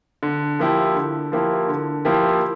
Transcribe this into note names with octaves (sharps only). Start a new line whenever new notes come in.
D3
F3 A#3 E4 G4
D3
F3 A#3 E4 G4
D3
F3 A#3 E4 G4